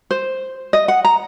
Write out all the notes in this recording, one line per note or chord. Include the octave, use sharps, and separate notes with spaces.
C5
D#5
F#5
A#5